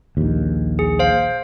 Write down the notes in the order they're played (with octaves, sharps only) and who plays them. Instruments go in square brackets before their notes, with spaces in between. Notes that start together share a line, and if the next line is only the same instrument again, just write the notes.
[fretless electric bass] A#1 D#2
[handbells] G#4
C5 F5